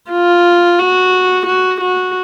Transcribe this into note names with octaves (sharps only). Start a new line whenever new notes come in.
F4
F#4
F#4
F#4